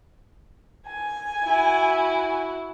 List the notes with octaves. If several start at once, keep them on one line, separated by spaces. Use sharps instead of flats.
G#5
E4 F#4